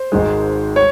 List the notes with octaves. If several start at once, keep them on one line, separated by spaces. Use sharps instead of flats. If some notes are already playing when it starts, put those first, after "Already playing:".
Already playing: C5
G#1 G#2 D#3 G#3
C#5